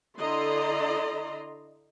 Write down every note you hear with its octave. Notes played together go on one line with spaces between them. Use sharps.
D3 E4 D5 D#5 A#5 C6